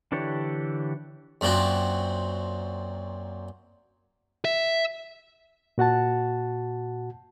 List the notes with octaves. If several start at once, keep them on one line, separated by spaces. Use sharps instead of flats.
D3 E3 D4 G4 C#5
F#2 A#2 C4 F#4
E5
A#2 F#4 F#5 A5